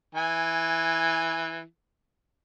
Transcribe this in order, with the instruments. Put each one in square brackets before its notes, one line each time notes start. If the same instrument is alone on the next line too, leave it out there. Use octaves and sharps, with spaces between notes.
[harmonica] E3 G#5